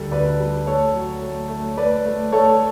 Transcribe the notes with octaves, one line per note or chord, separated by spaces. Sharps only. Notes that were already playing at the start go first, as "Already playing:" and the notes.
Already playing: D2 G3 A4
D2 B4 D5
G3
A3 A4 C#5
F#3
A3
A3
A3 B4 D5
A3
A3 A4 C#5